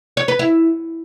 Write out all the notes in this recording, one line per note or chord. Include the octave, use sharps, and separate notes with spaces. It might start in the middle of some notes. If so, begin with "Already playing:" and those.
C#5
B4
E4